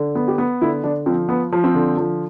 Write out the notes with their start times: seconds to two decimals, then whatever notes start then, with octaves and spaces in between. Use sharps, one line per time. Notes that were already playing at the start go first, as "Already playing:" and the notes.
Already playing: D3
0.15 B3
0.28 G4
0.38 B3
0.61 D3 E4
0.84 D3 D4
1.06 F3 C4
1.29 B3
1.52 F3
1.64 C4
1.75 D3
1.97 F3